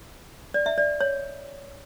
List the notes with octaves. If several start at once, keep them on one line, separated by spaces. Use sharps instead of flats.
D5
E5
D5
C#5